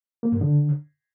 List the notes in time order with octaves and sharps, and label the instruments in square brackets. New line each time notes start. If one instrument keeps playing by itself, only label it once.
[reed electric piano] A#3
G2
D3